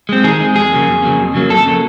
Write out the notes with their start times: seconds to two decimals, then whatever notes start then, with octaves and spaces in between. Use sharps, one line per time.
0.09 G#3 C4
0.24 D#3 G#4
0.40 G#3 C4
0.56 F2 G#4
0.71 C#3 F#3 A#3
0.87 F2
1.02 C#3 F#3 A#3
1.19 F2
1.34 C#3 F#3 A#3
1.50 F2 A4
1.66 C#3 F#3 A#3